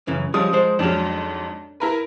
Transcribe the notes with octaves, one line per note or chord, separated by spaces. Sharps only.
F#2 C#3 E3
F3 G3 G#3 C#4 D#6
G#3 C5
F2 G#2 F#3 C#4 D4
E4 A#4 B4